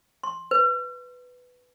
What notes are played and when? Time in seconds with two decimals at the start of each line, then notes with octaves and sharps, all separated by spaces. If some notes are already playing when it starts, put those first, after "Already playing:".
0.23 C6
0.51 B4